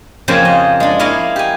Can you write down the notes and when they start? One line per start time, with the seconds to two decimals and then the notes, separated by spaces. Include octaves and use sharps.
0.28 F2 C#3 A#3 G4 C5 G#5
0.45 D#5
0.80 G#3 D4
0.99 A#3 E4 C#5 D#5 F5
1.36 G4 G#5